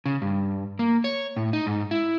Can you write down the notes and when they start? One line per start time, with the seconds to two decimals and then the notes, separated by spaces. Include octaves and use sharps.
0.06 C#3
0.22 G2
0.79 A#3
1.04 C#5
1.36 A2
1.53 D#4
1.67 G#2
1.91 E4